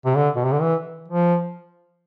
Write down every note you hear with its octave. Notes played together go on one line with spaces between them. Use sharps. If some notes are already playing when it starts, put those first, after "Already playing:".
C3
D3
B2
C3
D3
E3
F3